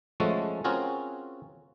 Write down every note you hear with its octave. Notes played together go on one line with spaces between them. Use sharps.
F3 G#3 A3 C#4 F#4 A4
C4 C#4 F4 F#4 G#4 A#4